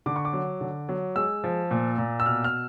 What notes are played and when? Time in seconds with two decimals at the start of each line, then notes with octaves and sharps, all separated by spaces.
0.06 D3 D6
0.16 C#6
0.25 D6
0.33 F#3
0.61 D3
0.89 F#3
1.16 G#3 E6
1.44 F3
1.71 A#2
1.98 A#2
2.20 E6
2.26 B2 F6
2.44 F6